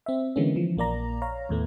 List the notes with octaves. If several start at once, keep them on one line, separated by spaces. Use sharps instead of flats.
C4 E5
D3 E3 G#3 A#3 B3 C#4
E3 F3
A#1 A#3 D5 A#5
C#5 F5 A#5
D#2 A2 A3 B3